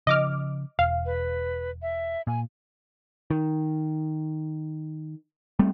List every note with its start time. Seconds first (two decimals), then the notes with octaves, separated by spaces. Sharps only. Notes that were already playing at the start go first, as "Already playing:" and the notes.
0.07 C#3 F3 D#5 D6 F6
0.79 E1 F5
1.06 B4
1.82 E5
2.27 A#2 G#5
3.30 D#3
5.59 G3 A3 C4